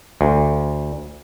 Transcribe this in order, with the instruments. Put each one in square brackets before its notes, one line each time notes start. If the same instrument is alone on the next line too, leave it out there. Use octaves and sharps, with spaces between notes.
[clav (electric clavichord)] D2